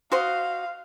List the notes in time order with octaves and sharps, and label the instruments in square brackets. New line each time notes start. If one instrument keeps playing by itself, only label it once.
[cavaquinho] F#4 C5 D#5 [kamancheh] F5